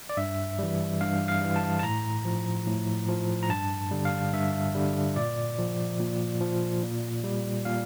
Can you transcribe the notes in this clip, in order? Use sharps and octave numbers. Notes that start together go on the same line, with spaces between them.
D5
G2 E5
E3 G3
G2 F5
F5
E3 G3
A5
A5
A2 A#5
F3
A2
F3
A#5
G2 A5
D3 G3
F5
G2 E5
D3 G3
A#2 D5
F3
A#2
F3
A#2
G3
A#2 F5